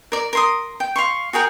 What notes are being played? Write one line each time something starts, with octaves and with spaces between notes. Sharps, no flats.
A#4 D5
A#4 C6 D#6
G5
F5 C6 C#6
F#4 G#4 A#4 G5